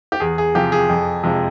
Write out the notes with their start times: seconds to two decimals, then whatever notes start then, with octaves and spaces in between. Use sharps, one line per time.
0.12 G4
0.20 E2 G#4
0.38 G#4
0.55 C3 F3 G4
0.72 G#4
0.89 F2
1.23 C3 F3 G#3